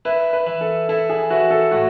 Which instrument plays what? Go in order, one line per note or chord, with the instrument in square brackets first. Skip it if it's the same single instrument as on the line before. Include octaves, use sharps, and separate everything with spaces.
[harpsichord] E4 [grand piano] B4
[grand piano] B4
[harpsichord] E3
[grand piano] A4
[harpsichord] E4 [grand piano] A4
[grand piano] G#4
[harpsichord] E3 [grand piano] F#4
[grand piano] A4
[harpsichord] A2 [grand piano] F#4